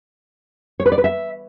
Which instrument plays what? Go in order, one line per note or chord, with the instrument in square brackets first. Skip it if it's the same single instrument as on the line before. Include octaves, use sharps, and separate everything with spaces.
[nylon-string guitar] C#5
B4
D5
B4
E5